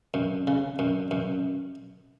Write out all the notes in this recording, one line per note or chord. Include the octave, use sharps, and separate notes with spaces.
F#2
C#3
F#2
F#2